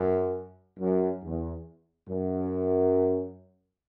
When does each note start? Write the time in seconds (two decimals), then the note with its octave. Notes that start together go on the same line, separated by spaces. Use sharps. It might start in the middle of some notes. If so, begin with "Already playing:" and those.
Already playing: F#2
0.79 F#2
1.22 E2
2.07 F#2